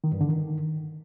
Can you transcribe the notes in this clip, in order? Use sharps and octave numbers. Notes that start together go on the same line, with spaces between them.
D#3
G2
D3
D#3